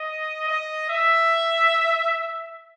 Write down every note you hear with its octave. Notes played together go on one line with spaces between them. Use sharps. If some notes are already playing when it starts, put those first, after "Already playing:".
Already playing: D#5
D#5
E5